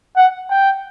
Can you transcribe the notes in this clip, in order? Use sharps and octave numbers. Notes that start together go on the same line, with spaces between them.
F#5
G5